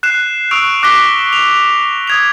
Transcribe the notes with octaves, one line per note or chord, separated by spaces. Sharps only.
F#6 C7 E7
C#6 D#6 E6 F#6 D7 F7
D6 F#6 A#6 B6 G7
F7
D#6 G#6 F7